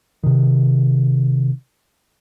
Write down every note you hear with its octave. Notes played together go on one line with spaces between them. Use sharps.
C3 D#3